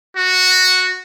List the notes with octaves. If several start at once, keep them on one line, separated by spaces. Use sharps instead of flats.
F#4